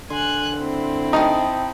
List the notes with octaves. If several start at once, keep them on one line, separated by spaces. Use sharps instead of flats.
D3 G#5 C6 F#6
C4 E4
D#4 G5 A5 D#6